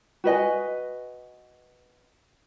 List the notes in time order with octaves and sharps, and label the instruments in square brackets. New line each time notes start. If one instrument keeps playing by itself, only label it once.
[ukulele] F#4 B4 D#5 G#5